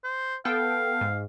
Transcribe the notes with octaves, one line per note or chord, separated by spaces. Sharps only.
C5
B3 A4 F5 G5
G#2